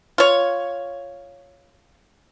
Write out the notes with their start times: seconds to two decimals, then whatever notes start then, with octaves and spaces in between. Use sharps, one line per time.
0.18 F4 C#5